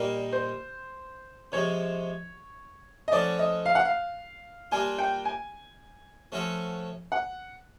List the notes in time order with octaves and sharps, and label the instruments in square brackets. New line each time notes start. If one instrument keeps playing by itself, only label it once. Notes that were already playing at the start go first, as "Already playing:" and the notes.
Already playing: [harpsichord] A#2 G3 A#3 D#4 [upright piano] A#4
[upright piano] C5
[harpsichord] C3 F3 G#3 [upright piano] C#5
[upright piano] D#5
[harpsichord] F3 A3 C#4 F#4 [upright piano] D5
[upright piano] D#5
F5
F#5
F5
[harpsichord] G3 A#3 D4 F4 [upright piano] G#5
[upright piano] G5
G#5
[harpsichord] F3 A3 C#4 F#4 A4
[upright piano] F#5